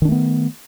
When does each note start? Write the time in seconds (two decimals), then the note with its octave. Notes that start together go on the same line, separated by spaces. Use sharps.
0.02 D#3
0.05 D4
0.08 A3
0.12 B3